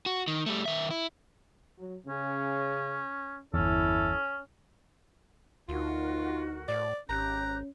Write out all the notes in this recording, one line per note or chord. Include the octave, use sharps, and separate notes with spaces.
F#4
D#3
G3 A3
D#3 E5
E4
F#3
C#3 C#4
G1 E2 C#4 E4 A4
D2 D#4 F4 F#4 A#4
A2 D5
G#1 C#4 G4 A#5 F#6 G6